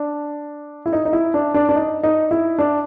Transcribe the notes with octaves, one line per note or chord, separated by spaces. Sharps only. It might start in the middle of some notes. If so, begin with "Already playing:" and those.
Already playing: D4
E4
D#4
D#4
E4
D4
D4
D4
D#4
D#4
E4
D4